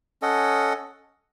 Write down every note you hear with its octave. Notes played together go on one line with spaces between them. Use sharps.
C#4 A4 D#5 F#5